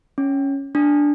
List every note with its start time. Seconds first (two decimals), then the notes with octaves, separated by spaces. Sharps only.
0.18 C#4
0.75 D4